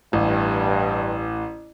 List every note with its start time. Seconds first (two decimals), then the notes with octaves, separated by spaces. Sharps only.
0.13 A1 G2